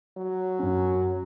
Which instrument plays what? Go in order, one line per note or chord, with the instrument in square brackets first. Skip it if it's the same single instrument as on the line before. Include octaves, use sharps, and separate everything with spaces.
[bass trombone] F#3
[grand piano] F#2 C#4